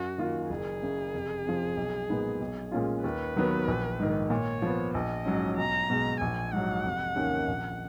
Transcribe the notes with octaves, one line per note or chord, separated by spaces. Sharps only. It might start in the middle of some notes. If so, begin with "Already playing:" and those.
Already playing: F#2 F#4
D#3 A#3 F4
F#1 G#4
F#2 C#3
F1
F2 F3
B1
A#2 G#3 B3 D#4
B1
A#2 G#3 C#4 F4
D#2 B4
D#3 F#3 B3
A#1
G#2 D#3
A#2 C#5
F3 B3
A#1 D#5
G#2 F#3 C#4
B1 A#5
B2 G#3
A#1 G#5
G#2 F#3 F#5
F1
D#2 D#3 A#3 C#4
A#1